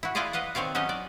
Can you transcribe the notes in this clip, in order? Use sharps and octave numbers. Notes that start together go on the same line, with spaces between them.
E4 F#4
E4 F4 G#4 D5 D#5 F5
B4 D#5 F5 F#5
D#3 C4 C#5 D5 F5
F#3 C#4 D#4 G4 D#5
D5